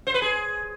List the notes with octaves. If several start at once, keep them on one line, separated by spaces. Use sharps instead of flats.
C5
B4
G#4